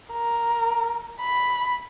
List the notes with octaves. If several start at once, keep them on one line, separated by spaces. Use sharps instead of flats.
A#4
B5